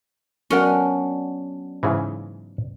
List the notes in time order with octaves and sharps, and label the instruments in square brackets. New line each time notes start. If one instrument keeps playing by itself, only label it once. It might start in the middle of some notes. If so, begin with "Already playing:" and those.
[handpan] F#3 B3 D4 [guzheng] C#4 [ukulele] F#4 A#4 F#5
[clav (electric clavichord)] G#2 C#3 E3